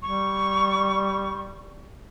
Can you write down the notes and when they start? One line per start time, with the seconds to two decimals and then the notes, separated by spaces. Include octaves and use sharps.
0.03 G3 C#6